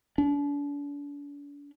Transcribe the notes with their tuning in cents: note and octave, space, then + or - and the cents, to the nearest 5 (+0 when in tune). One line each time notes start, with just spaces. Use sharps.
D4 -40